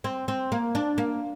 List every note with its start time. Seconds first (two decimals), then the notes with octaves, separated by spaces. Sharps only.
0.04 C4
0.28 C4
0.52 A#3
0.75 D4
0.98 A#3